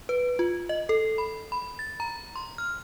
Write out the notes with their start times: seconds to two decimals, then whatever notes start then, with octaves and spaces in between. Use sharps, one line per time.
0.09 B4
0.39 F4
0.69 D#5
0.89 A4
1.18 B5
1.52 B5
1.79 A6
2.00 A#5
2.36 C6
2.58 F6